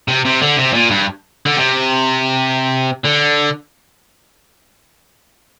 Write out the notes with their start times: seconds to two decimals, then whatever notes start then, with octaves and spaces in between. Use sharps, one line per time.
0.08 C3
0.25 C3
0.42 D3
0.58 C3
0.74 A#2
0.91 G2
1.46 D3
1.56 C3
3.05 D3